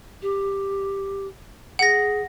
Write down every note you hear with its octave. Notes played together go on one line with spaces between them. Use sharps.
G4
G#4 F#5 A#6